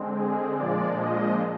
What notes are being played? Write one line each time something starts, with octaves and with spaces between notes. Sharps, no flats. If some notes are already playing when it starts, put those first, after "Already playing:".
Already playing: D3 G#3 C4
G#4
A#2 F3 G#3 D4 D5
D#5